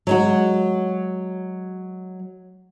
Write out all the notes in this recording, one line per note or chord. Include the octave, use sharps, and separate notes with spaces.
F#3 G#3 F#4